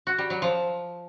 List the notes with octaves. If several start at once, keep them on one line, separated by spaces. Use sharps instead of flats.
F#4
G3
F#3
F3